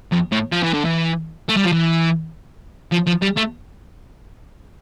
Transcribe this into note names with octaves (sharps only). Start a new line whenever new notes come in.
F2
A2
F3
E3
D3
E3
A3
G3
F3
E3
F3
F3
G3
A3